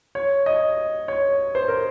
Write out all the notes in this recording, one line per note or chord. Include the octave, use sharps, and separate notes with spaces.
C#5
D#5
C#5
C5
A#4